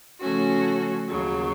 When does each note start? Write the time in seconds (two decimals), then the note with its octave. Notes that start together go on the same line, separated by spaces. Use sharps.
0.20 C#3 F3 A3 C#4 F#4
1.08 D#2 C#3 F#3